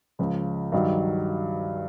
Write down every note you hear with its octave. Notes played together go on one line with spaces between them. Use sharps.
C#2 C#3 F3
G2 D#3 F#3